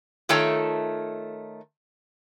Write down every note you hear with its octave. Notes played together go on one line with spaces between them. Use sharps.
D#3 A3 F4 A4 C#5 G5